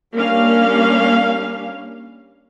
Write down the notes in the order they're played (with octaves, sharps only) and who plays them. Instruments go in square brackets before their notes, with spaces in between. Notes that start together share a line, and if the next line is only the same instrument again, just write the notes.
[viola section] G3 A#3 C#4 D4 F5